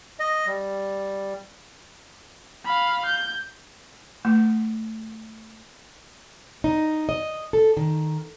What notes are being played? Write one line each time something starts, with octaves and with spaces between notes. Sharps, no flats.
D#5
G3
F5 B5
G6
A3
D#4
D#5
A4
D#3